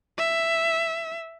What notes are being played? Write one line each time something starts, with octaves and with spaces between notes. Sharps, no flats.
E5